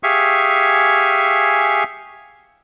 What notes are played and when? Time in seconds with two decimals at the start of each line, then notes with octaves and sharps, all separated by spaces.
0.03 G4 G#4 E5 F5 G#5 C#6